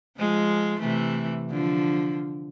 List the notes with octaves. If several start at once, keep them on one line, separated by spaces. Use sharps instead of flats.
F3 G#3
C3 E3 A3
D3 F3